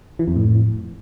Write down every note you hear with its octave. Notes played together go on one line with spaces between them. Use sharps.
E3
F2
A2